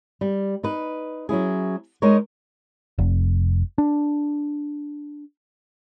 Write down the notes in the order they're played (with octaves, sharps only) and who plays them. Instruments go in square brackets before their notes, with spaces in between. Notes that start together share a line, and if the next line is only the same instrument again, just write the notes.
[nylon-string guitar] G3
D#4 B4
F#3 C#4 E4 G#4
G#3 D#4 G#4 A#4 C#5
[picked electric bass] F1
D4